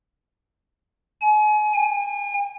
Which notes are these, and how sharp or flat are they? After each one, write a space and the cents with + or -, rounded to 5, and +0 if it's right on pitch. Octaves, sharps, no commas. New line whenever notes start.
G#5 +35
G#5 -45